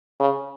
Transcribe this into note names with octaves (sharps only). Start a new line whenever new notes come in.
C#3